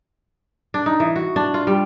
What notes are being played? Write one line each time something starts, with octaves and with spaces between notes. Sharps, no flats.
D4
D#4
E3
F#4
D4
F4
G3